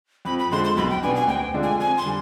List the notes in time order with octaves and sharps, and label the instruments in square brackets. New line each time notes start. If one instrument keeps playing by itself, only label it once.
[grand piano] F2 [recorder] B5
[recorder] B5
[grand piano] D3 F3 G#3 [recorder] C6
[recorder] C6
[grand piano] B1 [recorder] B5
[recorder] G5
[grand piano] B2 B3 D4 [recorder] G#5
[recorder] G#5
[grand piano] D2 [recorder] G5
[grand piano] D3 G#3 D4 F4
[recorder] G#5
[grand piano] F2 [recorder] G#5
[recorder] C6
[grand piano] D3 G3